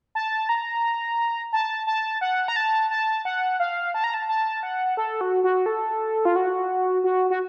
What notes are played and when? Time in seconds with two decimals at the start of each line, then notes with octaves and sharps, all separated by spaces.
0.15 A5
0.49 A#5
1.53 A5
1.87 A5
2.21 F#5
2.48 A#5
2.56 A5
2.90 A5
3.25 F#5
3.60 F5
3.94 A5
4.04 A#5
4.14 A5
4.29 A5
4.63 F#5
4.97 A4
5.21 F#4
5.44 F#4
5.66 A4
6.25 F4
6.36 F#4
7.04 F#4
7.30 F#4